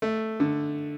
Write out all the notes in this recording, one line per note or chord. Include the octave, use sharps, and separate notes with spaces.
A3
D3